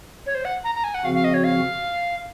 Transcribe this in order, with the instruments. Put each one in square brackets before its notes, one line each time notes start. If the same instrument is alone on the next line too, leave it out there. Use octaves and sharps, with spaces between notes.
[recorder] C#5
C5
F#5
A#5
A#5
G#5
F#5
[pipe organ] C#3 F3 C4 F#4 [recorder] F5
[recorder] F5
D#5
C#5
F5